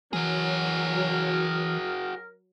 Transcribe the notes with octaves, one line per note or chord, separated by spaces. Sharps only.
E3 F#3 F#4 G#4 A#4